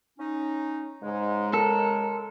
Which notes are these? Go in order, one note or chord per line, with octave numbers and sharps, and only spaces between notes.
C#4 D#4
G#2 C#3 G#3
A4 A#4